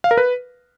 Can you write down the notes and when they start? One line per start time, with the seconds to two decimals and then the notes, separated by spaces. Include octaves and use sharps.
0.04 F5
0.11 A#4
0.17 B4